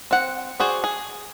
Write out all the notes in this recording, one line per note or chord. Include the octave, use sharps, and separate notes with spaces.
C4 F#5
F#4 G#4 C5 D5
G#4